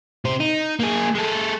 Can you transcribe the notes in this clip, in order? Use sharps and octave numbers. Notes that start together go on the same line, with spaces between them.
C3 C5
D#4
A#3 G#4
G#3 A4